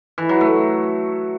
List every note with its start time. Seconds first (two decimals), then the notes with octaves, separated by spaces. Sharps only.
0.18 E3
0.29 F#3
0.41 A3